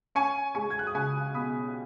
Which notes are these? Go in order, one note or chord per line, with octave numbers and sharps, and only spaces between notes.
C#4 G#5 C#6
G#3 G#5 C#6
G#6
F#6
D#6
C#2 G#5 C#6
B2 B5 D#6